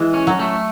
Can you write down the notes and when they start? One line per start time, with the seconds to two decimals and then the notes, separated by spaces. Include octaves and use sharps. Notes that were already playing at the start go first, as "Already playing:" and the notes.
Already playing: E3 G#3
0.14 C#4
0.27 F#3
0.39 A3